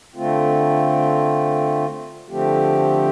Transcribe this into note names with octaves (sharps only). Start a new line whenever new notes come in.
D3 A3 C4 F4
D3 F3 A3 C4 G4